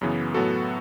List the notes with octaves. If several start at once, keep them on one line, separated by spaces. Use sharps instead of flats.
F#2 C#3 E3 B3
A2 F#3 B3 F#4 A4